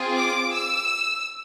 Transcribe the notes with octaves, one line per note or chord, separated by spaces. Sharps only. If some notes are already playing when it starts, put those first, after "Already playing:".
Already playing: C4 F4 G#4
D6
E6